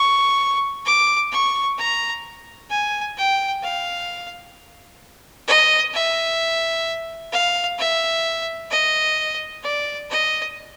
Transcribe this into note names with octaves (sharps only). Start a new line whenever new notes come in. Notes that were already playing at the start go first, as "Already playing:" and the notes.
Already playing: C#6
D6
C#6
A#5
G#5
G5
F5
D#5
E5
F5
E5
D#5
D5
D#5